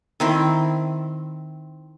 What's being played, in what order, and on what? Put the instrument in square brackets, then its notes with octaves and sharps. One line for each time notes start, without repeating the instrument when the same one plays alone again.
[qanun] D#3 C4 E4